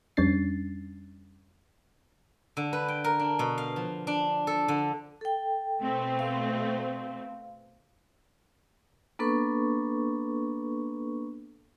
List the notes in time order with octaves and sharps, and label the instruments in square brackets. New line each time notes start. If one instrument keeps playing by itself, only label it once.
[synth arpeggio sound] F2 G3 C#4 D4 A6 C7
[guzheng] D3
B4
G5
A#4
D4
B2
F5
F3
D4
A4
D3
[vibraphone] A4 G5
[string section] B2 A3 C4
[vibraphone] F5
A#3 B3 D4 A4 B4 C#6